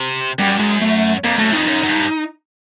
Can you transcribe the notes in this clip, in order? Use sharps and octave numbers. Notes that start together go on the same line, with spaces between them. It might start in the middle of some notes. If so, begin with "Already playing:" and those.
Already playing: C3
F#2 G3
G#3
A3
F2 A#3
F#2 A3
F2 D#4
F#2
F#2
G2